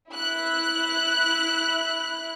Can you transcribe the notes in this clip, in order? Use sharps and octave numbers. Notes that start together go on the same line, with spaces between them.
E4 F#6